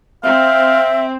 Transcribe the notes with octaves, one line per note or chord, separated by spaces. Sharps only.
C4 E5 F5